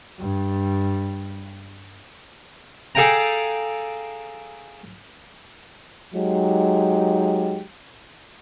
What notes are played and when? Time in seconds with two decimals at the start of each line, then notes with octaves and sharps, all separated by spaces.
0.19 G2 G3
2.95 G#4 A4 F5 G5 G#5 A#5
6.14 F#3 G#3 D#4 G4